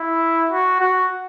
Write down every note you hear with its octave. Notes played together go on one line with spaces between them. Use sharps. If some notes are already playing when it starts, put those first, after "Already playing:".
Already playing: E4
F#4
F#4